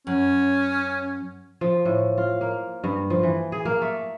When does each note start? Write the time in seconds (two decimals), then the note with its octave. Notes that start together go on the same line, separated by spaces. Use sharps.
0.07 F#2 C#4
1.61 F3
1.85 A2
2.18 F4
2.41 A#3
2.84 G2
3.10 F3
3.23 E3
3.52 G#4
3.65 A#3
3.82 A3